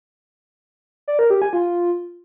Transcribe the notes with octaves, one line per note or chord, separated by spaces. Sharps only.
D5
A#4
G4
G#5
F4